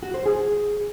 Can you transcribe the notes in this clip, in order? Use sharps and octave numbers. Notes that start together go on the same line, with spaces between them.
F#4
C5
G#4